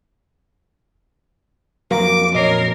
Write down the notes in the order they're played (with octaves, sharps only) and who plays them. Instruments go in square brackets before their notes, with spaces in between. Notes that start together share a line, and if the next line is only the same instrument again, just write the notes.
[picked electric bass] F2 F#3 [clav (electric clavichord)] A#3 [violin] D6
[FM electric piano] A#2 C7 [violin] A#4 [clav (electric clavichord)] C#5 D#5